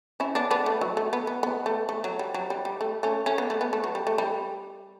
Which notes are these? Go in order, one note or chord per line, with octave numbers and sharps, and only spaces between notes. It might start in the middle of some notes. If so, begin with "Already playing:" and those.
C#4 E4
B3 D4
B3 D4
A3
F#3
A3
B3
B3
B3
A3
A3
F#3
G3
F#3
G3
G3
A3
A3 C#4
A3 C#4
B3
A3
B3
A3
F#3
G3
A3
G3